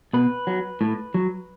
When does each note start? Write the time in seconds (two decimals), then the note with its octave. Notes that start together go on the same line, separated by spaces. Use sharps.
0.13 B2 B4
0.47 F#3
0.81 A2
1.14 F#3